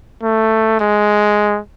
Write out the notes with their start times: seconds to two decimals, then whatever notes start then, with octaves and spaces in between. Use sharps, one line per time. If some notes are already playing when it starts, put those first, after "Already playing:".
0.23 A3
0.80 G#3